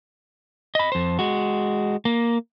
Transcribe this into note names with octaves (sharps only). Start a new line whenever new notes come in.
D#5 B5
F2 C5
G#3 F#4
A#3